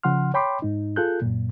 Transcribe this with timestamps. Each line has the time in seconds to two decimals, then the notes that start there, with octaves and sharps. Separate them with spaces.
0.03 C#3 F3 F#5 C6 F6
0.34 C#5 G5 B5 C6 D6
0.62 G#2 D#4
0.96 F4 G#4 A4 F#6 G6
1.22 F#2 A#2